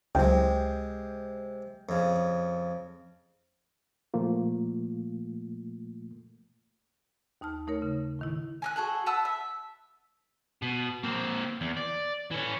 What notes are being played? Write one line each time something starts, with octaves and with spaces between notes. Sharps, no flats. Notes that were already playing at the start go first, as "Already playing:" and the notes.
C#2 C3 F#3 G#3 G5
F2 C#3
A#2 F3 A3 A#3 F4
D#2 D#4 A5 F6
A3 D#4 A#4 C#5
C#3
A2 D#3 E4
G#5 A#5 F#6
F#4 G#4 A4 F#5
B4 F#5 A5 E6
E5
B2
A#3 C4
E2
D5
E3 C#4